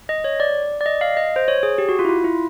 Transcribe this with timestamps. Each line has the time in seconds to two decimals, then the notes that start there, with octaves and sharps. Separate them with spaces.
0.09 D#5
0.24 C#5
0.40 D5
0.81 D5
0.86 D#5
1.01 F5
1.17 D#5
1.36 C5
1.48 C#5
1.63 G#4
1.78 G4
1.89 F#4
1.99 F4
2.05 E4
2.09 F4
2.24 E4